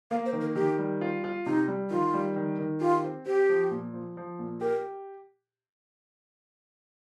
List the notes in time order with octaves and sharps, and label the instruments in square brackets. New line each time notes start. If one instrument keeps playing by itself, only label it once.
[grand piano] A#3 [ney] F5
[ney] C5
[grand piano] D#3
[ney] A#4
[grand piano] D#3 [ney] G4
[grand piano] G3
F4
F4
[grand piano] C3 [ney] D#4
[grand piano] G3
[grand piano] D#3 [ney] F4
[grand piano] G3
D#3
D#3
[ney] F4 [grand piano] G4
[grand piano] C4
[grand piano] C4 [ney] G4
[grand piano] F3
A#2
F3
F3
A#2
[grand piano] G4 [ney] A#4